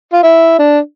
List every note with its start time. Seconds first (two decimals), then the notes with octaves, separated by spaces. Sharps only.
0.13 F4
0.23 E4
0.59 D4